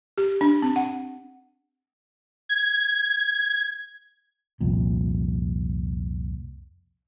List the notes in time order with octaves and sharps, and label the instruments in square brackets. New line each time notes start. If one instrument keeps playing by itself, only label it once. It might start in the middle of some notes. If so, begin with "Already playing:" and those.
[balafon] G4
D4
C4
F#5
[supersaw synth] G#6
[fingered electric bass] C2 F2 A#2